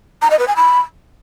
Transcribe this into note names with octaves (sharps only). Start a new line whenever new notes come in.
A#5
D#5
B4
G#5
B5